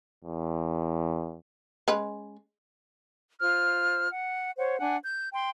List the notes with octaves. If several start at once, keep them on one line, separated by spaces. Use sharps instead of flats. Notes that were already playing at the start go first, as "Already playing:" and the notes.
E2
G#3 C#4 B4
F4 C5 F6
F#5
C5 C#5 F#5
D4 F#5 G#5
G6
G5 C6